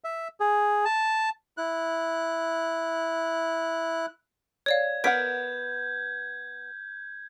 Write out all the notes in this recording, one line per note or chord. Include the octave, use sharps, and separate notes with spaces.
E5
G#4
A5
E4 F#6
C#5 D5 F5 G#6
B3 A#4 F#5 G6 G#6 B6 D7